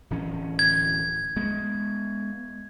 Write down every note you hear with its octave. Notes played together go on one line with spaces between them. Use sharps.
D1 E3 C#4
G#6
G#3 B3